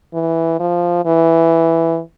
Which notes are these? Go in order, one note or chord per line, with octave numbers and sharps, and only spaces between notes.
E3
F3
E3